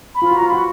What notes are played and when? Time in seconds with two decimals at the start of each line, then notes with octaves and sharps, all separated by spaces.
0.15 B5
0.22 F4
0.31 F#4
0.37 F4 A#5
0.48 F#4 B5